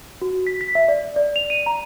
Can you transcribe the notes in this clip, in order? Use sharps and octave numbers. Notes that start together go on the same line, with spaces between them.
F#4
B6
B6
E5
D5
D5
F7
D#7
A#5